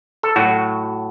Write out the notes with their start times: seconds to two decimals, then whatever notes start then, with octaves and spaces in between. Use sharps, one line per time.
0.23 A4
0.36 A2 F#3 F#4